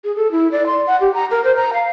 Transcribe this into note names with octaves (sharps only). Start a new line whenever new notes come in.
G#4
A4
E4
D5
C6
F#5
G4
A#5
A#4
C5
A#5
F5